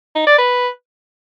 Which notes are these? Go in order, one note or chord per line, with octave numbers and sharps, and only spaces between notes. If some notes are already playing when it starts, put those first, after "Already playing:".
D#4
D5
B4